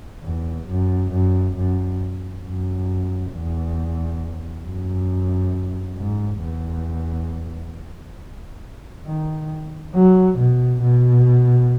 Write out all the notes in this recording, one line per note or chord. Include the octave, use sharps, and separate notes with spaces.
E2
F#2
F#2
F#2
F#2
E2
F#2
G#2
E2
D#3
F#3
B2
B2